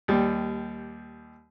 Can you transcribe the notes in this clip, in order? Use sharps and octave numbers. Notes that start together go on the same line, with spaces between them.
D#2 G3